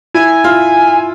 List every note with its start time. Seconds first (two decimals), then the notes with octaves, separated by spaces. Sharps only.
0.14 E4 G#5
0.44 F4